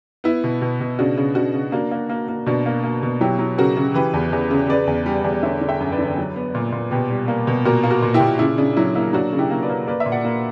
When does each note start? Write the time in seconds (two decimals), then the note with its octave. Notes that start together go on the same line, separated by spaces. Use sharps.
0.24 B3 E4
0.44 B2
0.61 B2
0.80 B2
0.99 C#3 D4 F#4
1.17 C#3
1.35 C#3 D4 F#4
1.54 C#3
1.72 A#3 D4 F#4
1.91 A#3
2.09 A#3
2.28 A#3
2.46 B2 D4 F#4
2.66 A#3
2.84 A#3
3.03 B2
3.21 F#3 E4 G4
3.39 F#3
3.58 C#3 F#4 A#4
3.77 C#3
3.94 E3 G4 B4
4.14 E2
4.32 E2
4.51 C#3
4.69 C#3 B4 D5
4.87 E2
5.06 G3
5.24 E2
5.43 D3 C#5 E5
5.61 D3
5.69 E5 G5
5.80 F#2
5.92 B4 D5
5.98 D3
6.18 F#3
6.36 B3
6.55 A#2
6.72 A#2
6.91 B2 G4 B4
7.10 G3
7.28 A#3
7.47 B2
7.65 A#2 F#4 A#4
7.83 A#3
7.90 F#4 A#4
8.02 A#2
8.14 E4 G4
8.20 A#2
8.39 C#3 E4
8.58 C#3 D4
8.77 F#3 E4
8.95 A#3 E4
9.13 F#3 D4 F#4
9.33 C#3
9.38 E4 G4
9.51 A#3
9.63 B4 D5
9.69 A#3
9.87 A#3 B4 D5
10.00 E5
10.06 A#2
10.12 D5 F#5
10.25 A#3